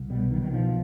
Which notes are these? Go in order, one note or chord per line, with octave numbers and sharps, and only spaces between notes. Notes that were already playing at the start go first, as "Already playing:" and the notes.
Already playing: C2
B2 G3
B1 D#3
D#3
B2 F3